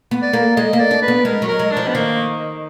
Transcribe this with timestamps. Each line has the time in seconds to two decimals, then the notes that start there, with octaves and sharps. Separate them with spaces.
0.11 B3
0.22 D5
0.33 A#3
0.56 G#3 D#5
0.73 A#3
0.80 D5
0.91 D4
1.02 B4
1.08 B3
1.25 G#3 A#4
1.42 F#3
1.48 A#4
1.59 G#3
1.72 D4
1.77 F3
1.88 B3
1.95 D#3 A#3